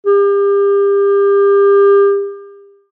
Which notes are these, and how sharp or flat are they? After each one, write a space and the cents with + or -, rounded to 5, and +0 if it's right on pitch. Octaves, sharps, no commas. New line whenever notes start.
G4 +35